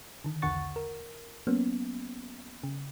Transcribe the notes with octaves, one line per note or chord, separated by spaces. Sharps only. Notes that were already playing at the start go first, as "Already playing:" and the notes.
D3 D#3
B1 E2 D3 F#5 C#6 A6
A#4
F#3 A#3 B3 C#4
C#3